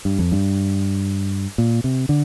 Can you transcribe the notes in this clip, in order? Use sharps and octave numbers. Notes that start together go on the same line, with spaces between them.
G2
F2
G2
A#2
C3
D3